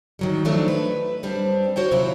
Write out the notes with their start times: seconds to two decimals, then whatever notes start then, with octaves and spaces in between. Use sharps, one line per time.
0.19 D#3 F#3 G3
0.45 D#3 F3 F#3 A3 D4 D#4
0.68 B4
1.23 F#2 G3 C4 D4
1.76 F#4 C5 C#5 G5
1.91 D#2 C3 F#3 E4 F4 C#5